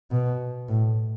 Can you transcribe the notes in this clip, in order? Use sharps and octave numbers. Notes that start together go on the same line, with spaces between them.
B2
A2